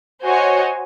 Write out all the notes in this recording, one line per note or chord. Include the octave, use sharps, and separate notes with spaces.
F#4 C5 C#5 D#5 G#5